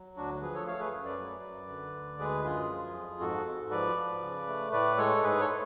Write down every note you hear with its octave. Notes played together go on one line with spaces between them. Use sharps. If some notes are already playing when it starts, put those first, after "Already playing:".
Already playing: F#3
D2 D4 F#4
F3 G#4 B4
A4 C#5
A3 C#5 F5
G#4 B4
F#2
B4 D5
F#3
F#2
D3
D2
G#3 G#4 B4
F#2 F4 G#4
F3
F2
G#2 F#4 A4
G#2
F3 B4 D5
F3
C#3
A3
A2 B4 D5
G#3 A4 C#5
G#2 G#4 B4
A4 C#5
A3